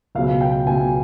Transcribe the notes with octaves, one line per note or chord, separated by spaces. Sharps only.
C#2 B2 F#3 F5
G5
C#2 B2 F#3 G#5